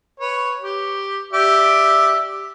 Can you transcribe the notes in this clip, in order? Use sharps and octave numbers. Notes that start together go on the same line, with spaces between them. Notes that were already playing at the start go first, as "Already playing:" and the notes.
B4 C#5
G4
G4 D5 E5